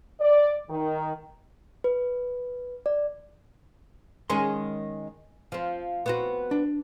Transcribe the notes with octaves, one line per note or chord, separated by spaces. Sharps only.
D5
D#3
B4
D5
D#3 G#3 C#4 G#5 C6
F3 C4
B3 C4 F#4
D4